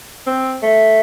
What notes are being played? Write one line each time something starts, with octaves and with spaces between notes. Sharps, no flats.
C4
A3